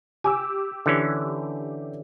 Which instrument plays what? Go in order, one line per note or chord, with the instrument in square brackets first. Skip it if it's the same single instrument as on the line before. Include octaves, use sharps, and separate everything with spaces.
[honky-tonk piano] G4 D6 E6 [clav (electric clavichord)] G#5
[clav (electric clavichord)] D3 E3 C#4